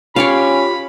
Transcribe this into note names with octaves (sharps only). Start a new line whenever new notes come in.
C#4 F4 G4 C#5 D5 F5 B5